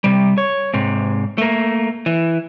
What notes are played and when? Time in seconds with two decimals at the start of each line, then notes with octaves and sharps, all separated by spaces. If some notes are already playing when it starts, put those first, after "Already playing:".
0.04 C3 G3
0.38 C#5
0.74 G#2 C3
1.38 A3 A#3
2.06 E3